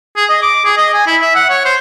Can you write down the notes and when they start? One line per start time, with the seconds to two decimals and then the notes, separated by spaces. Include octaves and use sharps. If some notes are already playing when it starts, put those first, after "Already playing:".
0.17 G#4
0.30 D#5
0.43 D6
0.65 G#4
0.77 D#5
0.94 G#5
1.07 E4
1.21 E5
1.35 F#5
1.50 C#5
1.65 C5